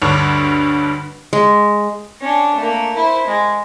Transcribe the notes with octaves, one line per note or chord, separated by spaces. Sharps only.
D2 G2 D3 D4 C#5
G#3
C#4 D4
A3 A#3
E4 C5
G#3